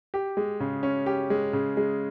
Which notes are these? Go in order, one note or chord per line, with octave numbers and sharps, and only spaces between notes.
G4
G#3
C#3
C#4
G4
G#3
C#3
G#3